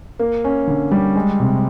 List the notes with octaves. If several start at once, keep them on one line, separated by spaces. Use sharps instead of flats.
A#3
C#4
D3
G3
G#3
C3